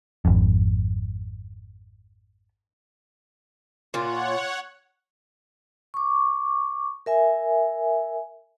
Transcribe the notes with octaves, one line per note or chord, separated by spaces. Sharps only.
G#1 F2
A#2 F4 C#5 F#5
C#6 D6
A#4 E5 G#5